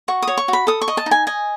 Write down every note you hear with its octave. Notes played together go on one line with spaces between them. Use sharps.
F#4 C#6
D#6
C#5
C#6
F#4 B5
A4 D#6
C#6
D#5
A5
D#4
G#5
D#5 G#5